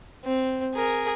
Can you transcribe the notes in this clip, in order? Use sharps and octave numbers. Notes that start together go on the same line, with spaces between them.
C4
G#4 A#4